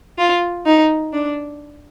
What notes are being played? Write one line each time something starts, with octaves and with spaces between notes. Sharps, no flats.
F4
D#4
D4